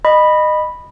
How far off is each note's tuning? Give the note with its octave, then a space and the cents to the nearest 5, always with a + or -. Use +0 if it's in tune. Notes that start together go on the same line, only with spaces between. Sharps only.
D#5 -20 B5 -5